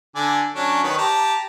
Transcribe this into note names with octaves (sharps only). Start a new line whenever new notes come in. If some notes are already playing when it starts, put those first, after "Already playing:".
D3 D5 G#5
F#3 C#4 D4
D#3 B4 C#5
G4 A5 A#5